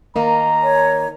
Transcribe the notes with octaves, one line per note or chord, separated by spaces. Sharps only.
D#3 A#3 D#4 A#5
C#5